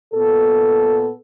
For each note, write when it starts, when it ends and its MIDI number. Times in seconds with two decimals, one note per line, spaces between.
0.14 1.13 46
0.14 1.13 59
0.14 1.13 69